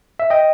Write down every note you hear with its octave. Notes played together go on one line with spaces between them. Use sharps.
E5
D#5 G5